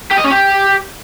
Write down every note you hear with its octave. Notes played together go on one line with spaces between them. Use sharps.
G4
D#5
C#4
G4